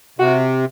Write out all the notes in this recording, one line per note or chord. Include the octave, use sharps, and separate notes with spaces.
C3 F#4